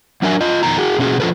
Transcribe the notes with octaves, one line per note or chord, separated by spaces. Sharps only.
F#3 D4 F#4 A#4 E5 G#5
F4 D#5
F2 B2 D#3 A#5
F#4 G#4
B2 C#4 F#4 G#4
F3 F4 A4 B4